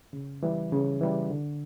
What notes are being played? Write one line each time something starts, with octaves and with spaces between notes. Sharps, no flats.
C#3
E3 G3
C#3
E3 G3
D3